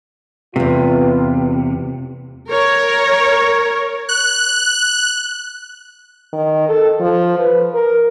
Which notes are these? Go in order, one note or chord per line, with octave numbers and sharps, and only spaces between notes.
E2 C3 A3 F4 B4
A#4 C#5
F#6
D#3
A4
F3
B4
A#4